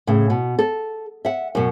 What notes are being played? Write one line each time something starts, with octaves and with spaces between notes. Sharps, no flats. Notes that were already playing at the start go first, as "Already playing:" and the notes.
A2 C#3
B2
A4
E5 F#5
F#2 B2